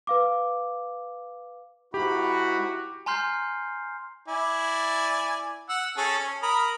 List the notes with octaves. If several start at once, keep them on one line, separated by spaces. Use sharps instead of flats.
B4 F5 D6
G#2 E4 F#4 G4 B5
G#5 A#5 C6 F6 G6 C7
E4 D5 G#5
F#5 E6
C#4 G#4 A4
C#4
A#4 B5 D#6